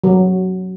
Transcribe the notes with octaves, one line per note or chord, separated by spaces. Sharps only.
F#3